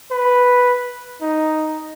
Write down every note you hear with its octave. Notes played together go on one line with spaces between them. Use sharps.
B4
D#4